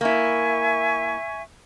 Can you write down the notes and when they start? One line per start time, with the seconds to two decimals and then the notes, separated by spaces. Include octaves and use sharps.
0.01 A#3 E4 E5 G#5 C#6